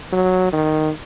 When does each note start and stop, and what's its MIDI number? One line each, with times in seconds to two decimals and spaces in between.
0.12 0.52 54
0.53 0.90 51